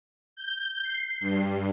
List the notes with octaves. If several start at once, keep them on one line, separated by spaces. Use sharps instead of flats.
G6
C7
G2